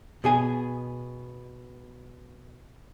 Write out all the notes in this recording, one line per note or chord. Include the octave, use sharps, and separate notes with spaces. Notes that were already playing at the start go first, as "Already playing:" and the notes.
B2 G#4 G#5